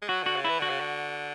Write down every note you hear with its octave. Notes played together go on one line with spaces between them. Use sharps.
G#3
F#3 F#4
D3 F#4
C#3
E3 E4
D3 F#4
C#3
D3